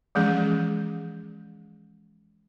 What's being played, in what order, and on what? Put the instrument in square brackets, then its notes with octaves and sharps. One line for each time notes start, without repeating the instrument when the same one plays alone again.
[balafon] E3 F3 G#3 C#4 G#4